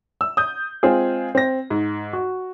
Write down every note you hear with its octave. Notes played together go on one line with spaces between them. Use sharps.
E6
D#6 G6
G#3 C4 F4 G#4
C4 A#6
G#2
F#4